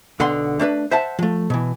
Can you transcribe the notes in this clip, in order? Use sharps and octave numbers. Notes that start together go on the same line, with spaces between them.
B1 D3 B3 F#5 C6
A3 D4 A#4 B4
C5 E5 F#5 A5
F3 A3
B2 E3